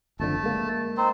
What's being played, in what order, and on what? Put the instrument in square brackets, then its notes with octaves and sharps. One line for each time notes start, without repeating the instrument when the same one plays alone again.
[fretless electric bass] F#1 F2 D3 [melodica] A3 A5
[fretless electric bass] G#3 A#3
[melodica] C4 D#4 C5